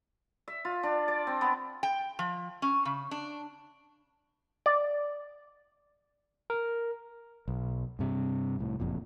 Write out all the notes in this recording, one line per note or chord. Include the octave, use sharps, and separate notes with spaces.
E5
F4
D4
D5
C4
B3
G5
F3
C#4
C#3
D4
D5
A#4
B1
G2 C3
C2 A2
F#1 F2 A#2